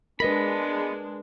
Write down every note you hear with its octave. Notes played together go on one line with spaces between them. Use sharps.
G#3 B3 D4 A#4 B4 D#5 B5